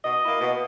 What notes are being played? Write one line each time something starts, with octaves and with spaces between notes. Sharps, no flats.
B2 D#5
A#3 E4
B2